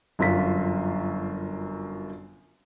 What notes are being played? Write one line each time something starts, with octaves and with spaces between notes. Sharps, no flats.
G1 F#2 F4 B6